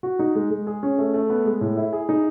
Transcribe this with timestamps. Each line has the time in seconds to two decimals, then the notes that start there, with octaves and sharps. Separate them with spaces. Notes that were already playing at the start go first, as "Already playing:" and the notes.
0.03 F#4
0.19 D#4
0.35 G#3
0.50 G#3
0.67 G#4
0.83 C#4
0.98 A3
1.14 A3
1.30 B3
1.46 G#3
1.61 A2
1.77 E4
1.93 G#4
2.09 D#4